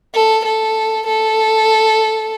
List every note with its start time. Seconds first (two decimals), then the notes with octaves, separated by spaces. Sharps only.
0.15 A4
0.45 A4
1.07 A4